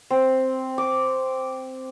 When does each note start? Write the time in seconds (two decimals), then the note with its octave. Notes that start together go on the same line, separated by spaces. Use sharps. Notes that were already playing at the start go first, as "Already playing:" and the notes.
0.10 C4
0.78 D6